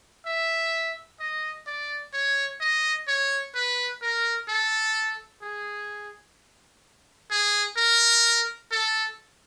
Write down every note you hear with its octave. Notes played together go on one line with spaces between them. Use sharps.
E5
D#5
D5
C#5
D#5
C#5
B4
A#4
A4
G#4
G#4
A#4
A4